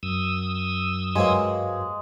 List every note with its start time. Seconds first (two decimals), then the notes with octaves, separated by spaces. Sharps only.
0.03 F#2 D#6 E6
1.15 G2 F#3 G#3 A#3 C4 B4